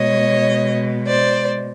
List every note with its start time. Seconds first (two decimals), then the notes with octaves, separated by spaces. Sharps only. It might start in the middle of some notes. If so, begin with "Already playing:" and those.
Already playing: B2 G#3 C#5 D#5
1.06 C5 D5